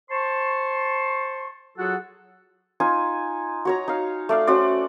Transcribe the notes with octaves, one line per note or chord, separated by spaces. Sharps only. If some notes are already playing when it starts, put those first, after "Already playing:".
C5 A5 C6 C#6
F#3 F4 F#4 G#4 A4 F#5
D#4 F4 G#5
F#4 C#5 A#5
D#4 F5
A3 D5 F5
C#4 F#4 C5 D5